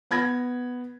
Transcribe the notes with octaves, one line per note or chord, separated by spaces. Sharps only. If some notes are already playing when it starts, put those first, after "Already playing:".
B3 B5 G#6 A#6